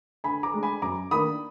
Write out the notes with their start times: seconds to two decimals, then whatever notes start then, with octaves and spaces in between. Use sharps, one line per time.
0.24 D3 G#5 B5
0.43 A#5 D6
0.54 G#3 D4
0.63 G#5 B5
0.82 F#2 A#5 D6
1.11 D#3 A#3 D4 B5 D#6